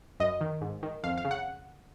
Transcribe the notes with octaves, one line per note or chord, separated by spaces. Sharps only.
F#2 D#5
D#3
G#2
D#3
F2 F5
F5
C#3
F#5